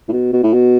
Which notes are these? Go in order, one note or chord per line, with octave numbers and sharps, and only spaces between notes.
A2
B2
B2
A2
B2